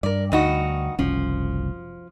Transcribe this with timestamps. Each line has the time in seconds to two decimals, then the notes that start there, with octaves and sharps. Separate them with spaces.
0.03 G2 A#4 D5
0.32 D2 G2 D#4 F#4
0.99 F#1 C2 F3 C#4